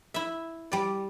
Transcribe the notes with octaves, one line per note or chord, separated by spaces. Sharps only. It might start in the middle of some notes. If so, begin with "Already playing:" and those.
E4 E5
G3 D5